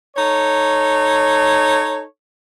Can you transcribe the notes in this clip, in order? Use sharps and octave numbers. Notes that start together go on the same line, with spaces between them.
D#4 A4 C#5